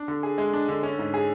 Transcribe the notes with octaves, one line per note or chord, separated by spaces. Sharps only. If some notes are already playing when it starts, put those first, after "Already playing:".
Already playing: D4
D3
G#4
G#3
D4
D3
C#4
G#2
G#4